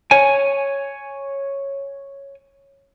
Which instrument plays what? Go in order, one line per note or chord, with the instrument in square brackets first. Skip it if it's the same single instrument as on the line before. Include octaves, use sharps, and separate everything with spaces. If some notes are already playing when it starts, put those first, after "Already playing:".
[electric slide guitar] C#5 G#5